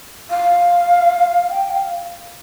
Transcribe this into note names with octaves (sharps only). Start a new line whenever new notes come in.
F5
G5
F5